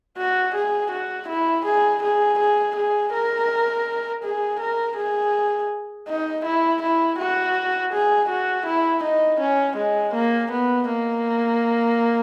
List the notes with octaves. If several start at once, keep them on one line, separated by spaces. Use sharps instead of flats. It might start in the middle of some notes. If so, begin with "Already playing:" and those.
F#4
G#4
F#4
E4
G#4
G#4
G#4
G#4
A#4
G#4
A#4
G#4
D#4
E4
E4
F#4
G#4
F#4
E4
D#4
C#4
G#3
A#3
B3
A#3